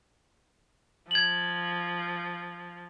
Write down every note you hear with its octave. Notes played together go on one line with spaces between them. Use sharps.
F3 G#6 F#7